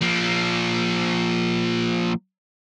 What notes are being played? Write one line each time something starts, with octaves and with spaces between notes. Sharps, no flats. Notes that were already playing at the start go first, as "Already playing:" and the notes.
F3 A#3